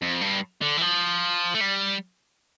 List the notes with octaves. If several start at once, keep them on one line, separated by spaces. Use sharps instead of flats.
F2
G2
D3
E3
F3
A3
G3